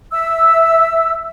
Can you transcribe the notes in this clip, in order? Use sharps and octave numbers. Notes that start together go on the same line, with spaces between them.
E5 E6